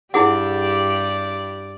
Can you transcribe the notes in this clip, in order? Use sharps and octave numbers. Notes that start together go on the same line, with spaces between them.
G2 D4 E4 G4 G#4 D5 F#5